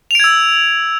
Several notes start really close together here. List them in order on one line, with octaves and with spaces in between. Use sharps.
F7 D7 G#6 E6